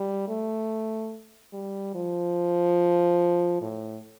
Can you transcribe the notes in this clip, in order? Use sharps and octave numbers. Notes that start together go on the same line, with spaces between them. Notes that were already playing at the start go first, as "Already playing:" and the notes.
Already playing: G3
A3
G3
F3
A2